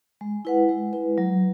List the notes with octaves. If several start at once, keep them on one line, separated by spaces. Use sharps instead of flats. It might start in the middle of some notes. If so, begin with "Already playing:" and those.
G#3
E4 B4 F#5
G#3
E4 B4
F#3